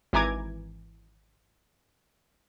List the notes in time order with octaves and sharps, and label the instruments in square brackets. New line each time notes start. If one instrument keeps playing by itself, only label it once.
[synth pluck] G#1 E3 G#5 A#5 D6 G#6